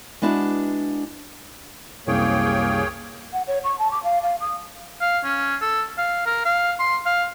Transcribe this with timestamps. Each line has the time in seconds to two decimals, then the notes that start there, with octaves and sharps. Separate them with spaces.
0.22 G#3 B3 D4 E4 F#4
2.07 C2 F#2 A#3 G#4 C#5 G5
3.33 F#5
3.47 C#5
3.64 C#6
3.79 A5
3.91 D6
4.04 F5
4.22 F5
4.41 D#6
5.01 F5
5.24 C#4
5.61 A4
5.98 F5
6.26 A#4
6.45 F5
6.79 C6
7.06 F5